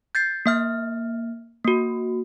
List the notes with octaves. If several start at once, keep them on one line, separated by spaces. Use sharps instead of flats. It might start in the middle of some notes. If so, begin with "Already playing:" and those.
G6 A6 C7
A#3 E5 F6
A#3 F#4